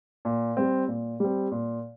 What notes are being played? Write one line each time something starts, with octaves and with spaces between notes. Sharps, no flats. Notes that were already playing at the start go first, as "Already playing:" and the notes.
A#2
G3 C4
A#2
G3 C4
A#2